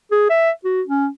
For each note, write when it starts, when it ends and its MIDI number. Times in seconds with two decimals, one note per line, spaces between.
0.11 0.26 68
0.29 0.51 76
0.65 0.82 66
0.87 1.08 61